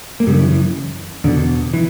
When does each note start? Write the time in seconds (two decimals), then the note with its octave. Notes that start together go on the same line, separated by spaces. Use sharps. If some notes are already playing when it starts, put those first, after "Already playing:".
0.20 A#3
0.27 F#2 C#3 G3
0.34 D3
0.39 E3
0.51 E3
1.24 E2 B2 D3
1.73 E3